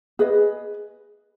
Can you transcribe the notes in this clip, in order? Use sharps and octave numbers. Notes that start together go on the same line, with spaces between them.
G#4 B4 D#5